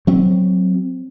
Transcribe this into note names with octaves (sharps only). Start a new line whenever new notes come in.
F#3 C4